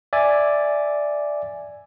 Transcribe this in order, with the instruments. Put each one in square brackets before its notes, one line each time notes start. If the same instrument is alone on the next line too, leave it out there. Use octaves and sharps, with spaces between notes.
[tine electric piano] D5 E5 G#5